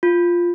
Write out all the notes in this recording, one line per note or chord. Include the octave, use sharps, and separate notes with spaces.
F4